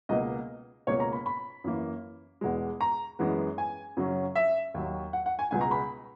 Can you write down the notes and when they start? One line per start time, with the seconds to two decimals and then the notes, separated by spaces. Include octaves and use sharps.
0.09 C#2 B2 A#3 D#5
0.87 C#2 B2 A#3 C#4 C#5
1.00 A#5
1.13 B5
1.26 B5
1.64 F#2 E3 A#3
2.41 E2 B2 G#3
2.81 A#5
3.19 F#2 E3 G#3 B3
3.58 G#5
3.97 F#2 C#3 F#3 C#4
4.35 E5
4.74 D#2 D#3 F#3
5.13 F#5
5.26 F#5
5.39 G#5
5.51 C#2 B2 G#3 G#5
5.61 A#5
5.71 B5